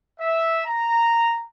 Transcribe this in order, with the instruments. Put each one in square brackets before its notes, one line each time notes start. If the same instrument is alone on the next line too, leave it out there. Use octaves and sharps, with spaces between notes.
[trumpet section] E5
A#5